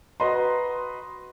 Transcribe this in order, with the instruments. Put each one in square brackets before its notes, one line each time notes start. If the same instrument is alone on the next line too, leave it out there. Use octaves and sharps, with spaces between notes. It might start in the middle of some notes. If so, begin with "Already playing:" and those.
[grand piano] F#4 B4 D#5 A#5 C6